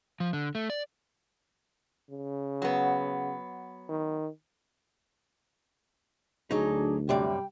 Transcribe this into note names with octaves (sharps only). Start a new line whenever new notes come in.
F3
D3
A3
D5
C#3
F#3 B3
D#3
D2 F#3 D4 D#4 G#4
F#2 C3 G3 D5 G5